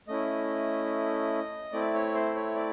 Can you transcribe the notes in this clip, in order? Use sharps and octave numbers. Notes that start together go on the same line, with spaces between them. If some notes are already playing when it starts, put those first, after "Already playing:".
A3 C#4 E4 D#5
A3 C4 E4 D5
C#5
C5
C#5
D5